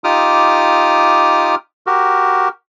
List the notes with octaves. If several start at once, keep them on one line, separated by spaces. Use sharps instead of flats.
D#4 F4 G4 D6 D#6 F6
F#4 G4 A#4